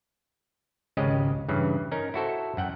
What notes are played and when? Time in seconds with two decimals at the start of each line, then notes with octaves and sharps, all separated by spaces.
0.97 G#1 C#2 C#3 G#3 G4 D#5
1.49 G2 C#3 E3
1.92 C#4 D#4 A#4
2.14 E4 F#4 A4 C5
2.57 F#2 F#5 G5